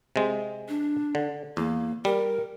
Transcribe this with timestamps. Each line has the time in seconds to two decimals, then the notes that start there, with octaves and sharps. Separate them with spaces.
0.16 C3 G#3
0.69 D4
1.15 D3
1.57 E2 A#3
2.05 G3 A#4